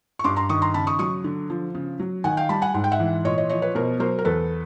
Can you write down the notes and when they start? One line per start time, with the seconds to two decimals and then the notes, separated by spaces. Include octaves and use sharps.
0.19 C#6
0.24 G2 C6 D6
0.36 A#5 C6
0.49 D#3 C#6 D#6
0.62 A#5 C6
0.74 C#3 A5 B5
0.87 C#6 D#6
0.99 F#3 C#6 D#6
1.24 D3
1.50 F3
1.75 C#3
1.99 F#3
2.24 D#3 F#5 G#5
2.37 F5 G5
2.49 G3 A5 B5
2.62 F#5 G#5
2.74 G#2 F#5
2.84 G5
2.92 E5 F#5
3.00 E3
3.25 A#2 C#5 D#5
3.38 C#5 D#5
3.49 F3 C#5 D#5
3.62 B4 C#5
3.75 B2 A#4 C5
4.00 F#3 A#4 C5
4.19 A#4
4.25 E2 A4 B4